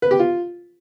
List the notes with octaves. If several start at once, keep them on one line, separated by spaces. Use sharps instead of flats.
B4
G4
F4